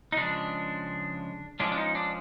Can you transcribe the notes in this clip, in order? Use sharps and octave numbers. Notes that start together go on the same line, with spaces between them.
D#4
C#3 F3 G#3 D4
F3 G#3 C#4 D4
D4
D#4
D4